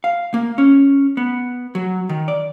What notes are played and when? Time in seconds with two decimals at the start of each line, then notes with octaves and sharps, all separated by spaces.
0.04 F5
0.34 A#3
0.58 C#4
1.17 B3
1.75 F#3
2.09 D#3
2.28 D5